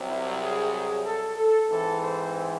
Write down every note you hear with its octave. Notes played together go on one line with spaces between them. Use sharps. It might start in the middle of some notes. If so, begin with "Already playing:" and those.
Already playing: C2 C3 F#3
E4
G#4
G#4
A4
A4
G#2 E3 C4 A4
C5